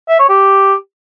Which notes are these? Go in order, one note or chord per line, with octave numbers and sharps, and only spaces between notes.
E5
C#5
G4